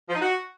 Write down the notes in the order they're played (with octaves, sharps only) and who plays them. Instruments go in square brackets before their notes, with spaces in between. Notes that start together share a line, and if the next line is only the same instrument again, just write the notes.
[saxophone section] F3
D#4
F#4